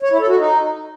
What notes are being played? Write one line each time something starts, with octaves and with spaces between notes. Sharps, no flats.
C#5
E4
A4
F#4
D#4